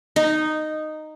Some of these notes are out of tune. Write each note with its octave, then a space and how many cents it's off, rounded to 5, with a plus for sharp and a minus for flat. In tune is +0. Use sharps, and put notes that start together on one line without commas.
D#4 -10